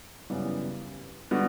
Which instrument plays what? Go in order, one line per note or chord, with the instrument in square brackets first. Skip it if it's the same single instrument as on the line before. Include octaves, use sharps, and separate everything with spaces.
[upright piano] F#2 C#3 E3 G3 B3
D3 G3 B3 F#4